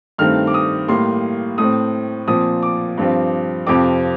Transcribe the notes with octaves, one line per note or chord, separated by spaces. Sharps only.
G2 D#3 A3 C4 F6
D6
D#6
A2 G3 A#3 C6
A2 A3 C4 D#6
A#2 F3 C4 D#6
D6
G2 F3 C4
F2 C3 F3 C4 D6